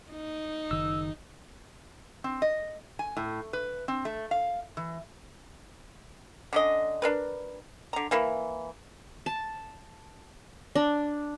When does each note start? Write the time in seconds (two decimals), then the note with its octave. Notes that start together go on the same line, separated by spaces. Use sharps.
0.11 D#4
0.71 F#1 D#3 E6
2.24 C4
2.42 D#5
2.99 G#5
3.17 A2
3.53 B4
3.88 C4
4.05 A3
4.31 F5
4.77 E3
6.53 D3 C#4 D#5
7.02 D4 A#4 B4
7.93 D3 A#5
8.11 E3 A#3 E4
9.26 A5
10.75 D4